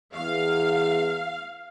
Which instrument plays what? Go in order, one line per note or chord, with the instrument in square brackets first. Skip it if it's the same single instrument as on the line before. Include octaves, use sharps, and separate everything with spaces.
[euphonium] E2 [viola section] F5